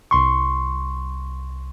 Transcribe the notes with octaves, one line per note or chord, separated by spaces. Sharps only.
C2 C6 C#6